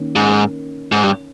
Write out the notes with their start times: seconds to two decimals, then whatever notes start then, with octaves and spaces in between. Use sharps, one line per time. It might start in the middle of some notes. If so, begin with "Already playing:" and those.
Already playing: D#3 A#3 C#4
0.16 G#2
0.92 G#2
1.03 G2